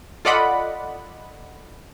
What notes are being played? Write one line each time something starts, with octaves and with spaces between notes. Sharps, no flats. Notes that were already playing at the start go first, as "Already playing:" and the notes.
F4 A4 D5 D#5 F#5 B5